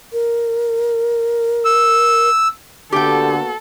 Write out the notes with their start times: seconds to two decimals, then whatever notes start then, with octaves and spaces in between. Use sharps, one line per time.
0.13 A#4
1.65 E6
2.92 D3 A#3 B3 F#4 G4 A4 G5